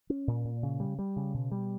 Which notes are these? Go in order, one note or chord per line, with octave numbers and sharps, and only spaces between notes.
C#4
A#2
A#2
C#3
G3
G3
C#3
B2
G3